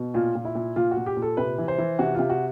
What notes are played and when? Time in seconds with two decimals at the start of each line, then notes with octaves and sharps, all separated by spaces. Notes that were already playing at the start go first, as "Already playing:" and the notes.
Already playing: B2
0.14 A#2 F4
0.35 A#2
0.45 E4
0.55 A#2
0.76 A#2 F4
0.91 F#4
0.97 A#2
1.06 G4
1.17 A#2
1.22 A4
1.37 C3 B4
1.58 E3
1.68 C5
1.78 E3
1.99 C3 F#4
2.15 C3 F4
2.30 F#4